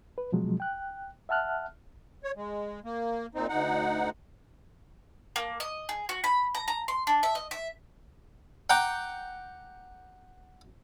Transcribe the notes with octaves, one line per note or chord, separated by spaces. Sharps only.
B4
B2 F3 F#3 G#3
G5 F#6
E5 F#5 A5 F6 F#6
C#5
G#3
A#3
A#2 C4 D#4
D2 D#4 F#5
A#3
D#5
G#4
F#4
B5
A#5
A#5
C6
D4
E5
D#5
E5
F#5 G5 A#5 D6